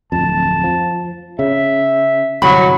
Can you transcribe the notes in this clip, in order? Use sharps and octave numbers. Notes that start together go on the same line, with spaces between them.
D1 F2 A5
F3
C#3 E5
G1 C2 C3 F#3 B5